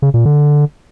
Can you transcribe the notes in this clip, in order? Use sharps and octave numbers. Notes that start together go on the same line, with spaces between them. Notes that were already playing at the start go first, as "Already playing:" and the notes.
C#3
A#2
D3